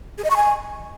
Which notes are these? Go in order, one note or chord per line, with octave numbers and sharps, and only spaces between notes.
G#4
D#5
C#6
G#5